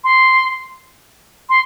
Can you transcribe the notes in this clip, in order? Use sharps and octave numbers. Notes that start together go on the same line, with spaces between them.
C6
C6